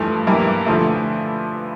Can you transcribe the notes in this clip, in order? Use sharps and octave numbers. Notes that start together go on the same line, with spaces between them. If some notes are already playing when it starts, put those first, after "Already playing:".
Already playing: G2 E3 F3 A3
G2 E3 G3 A#3 E4
D3 F3 A3